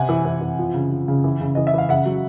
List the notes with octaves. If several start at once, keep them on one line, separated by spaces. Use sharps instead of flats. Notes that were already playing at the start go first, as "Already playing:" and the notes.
Already playing: C3 F#5 G#5
E3
E3
E3
F3
C#3
F3
C#3
E3
C#3
E3 D#5
E5
E3 F5
C#3 E5 F#5
F#3